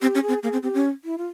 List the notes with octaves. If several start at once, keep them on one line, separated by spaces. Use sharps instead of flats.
C4 G4
C#4
G#4
C4
A#3 G#4
C4
C4 G4
C#4
E4
F4